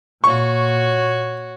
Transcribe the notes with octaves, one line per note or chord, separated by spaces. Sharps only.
A#2 F#4 C#5 C#6